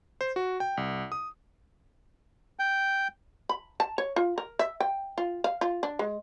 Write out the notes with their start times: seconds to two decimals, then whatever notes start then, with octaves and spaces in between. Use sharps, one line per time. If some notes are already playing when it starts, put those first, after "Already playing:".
0.21 C5
0.36 F#4
0.60 G5
0.77 C2
1.12 D#6
2.59 G5
3.49 B5
3.80 A5
3.98 C#5
4.16 F4
4.38 A#4
4.59 E5
4.80 G5
5.18 F4
5.44 F5
5.61 F4
5.83 D4
5.99 G#3